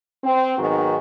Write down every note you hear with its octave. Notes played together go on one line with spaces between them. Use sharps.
C4
G#2 D#3 F#3 B3 F#4